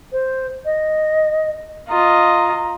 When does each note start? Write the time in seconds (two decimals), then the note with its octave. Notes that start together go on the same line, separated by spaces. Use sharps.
0.12 C5
0.65 D#5
1.89 F4 D#5 A#5